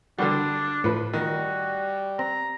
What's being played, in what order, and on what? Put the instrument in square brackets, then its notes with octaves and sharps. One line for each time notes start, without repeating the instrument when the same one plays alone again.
[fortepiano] D3 G3 [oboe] D4 [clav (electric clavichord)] F#4 B4
[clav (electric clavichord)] A2 [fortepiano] F3 B4
[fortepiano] D#3 [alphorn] G3 [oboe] F#4
[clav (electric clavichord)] C4 [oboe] A#5